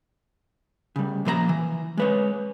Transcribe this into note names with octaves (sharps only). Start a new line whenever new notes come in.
C#3 G3
A#2 F3 A#4 A#5
E3
G#3 B4 C#5